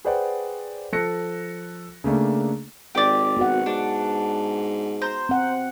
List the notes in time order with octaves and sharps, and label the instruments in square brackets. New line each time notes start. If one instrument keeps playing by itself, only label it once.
[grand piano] G#4 B4 C5 D5 F#5 G5
F3 A4 F#6 A#6 C#7
C#3 A3 A#3 D4
[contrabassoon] G#1 [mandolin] G4 D5
[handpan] B3 F#4 F#5
[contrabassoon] G#2 [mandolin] D4
[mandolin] C5 A#5
[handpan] C4 F#5